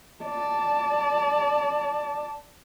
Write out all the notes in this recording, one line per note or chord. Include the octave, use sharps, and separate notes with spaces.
D5 A5